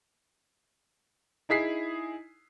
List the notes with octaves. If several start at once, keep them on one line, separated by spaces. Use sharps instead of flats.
D#4 E4 G#4 B6 C7